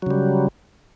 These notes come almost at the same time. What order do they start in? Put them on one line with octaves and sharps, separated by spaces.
F#3 C#3 G3